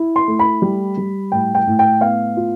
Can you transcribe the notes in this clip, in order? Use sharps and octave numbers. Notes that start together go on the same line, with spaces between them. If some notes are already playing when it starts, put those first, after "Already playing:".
Already playing: E4
C6
A3
B5
G3
G3
A2 G5
G5
A2
G5
B3 F5
F4